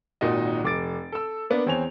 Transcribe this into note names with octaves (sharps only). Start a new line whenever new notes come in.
G#1 A#2 D#4 F#4 D#5
F1 D6 A6 D7
A4 E6
A#3 B3 D4
E2 C4 C#5 G#5 F7